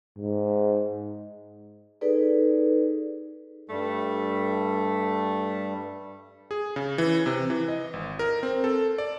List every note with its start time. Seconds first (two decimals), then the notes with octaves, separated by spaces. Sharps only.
0.18 G#2
2.01 D#4 G#4 A4 B4 D5
3.69 G2 G3 A3
6.51 G#4
6.76 C#3
6.98 E3
7.26 C3
7.50 E3
7.68 D#5
7.93 G#1
8.19 A#4
8.43 C4
8.64 A4
8.98 D5